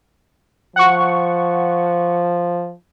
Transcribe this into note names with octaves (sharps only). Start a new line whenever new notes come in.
F3 F#5 C#6